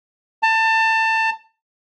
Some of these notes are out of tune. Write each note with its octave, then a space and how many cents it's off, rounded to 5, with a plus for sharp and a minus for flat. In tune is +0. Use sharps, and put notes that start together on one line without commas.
A5 +25